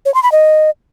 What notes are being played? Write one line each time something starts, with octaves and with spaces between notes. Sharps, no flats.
C#5
C6
B5
D#5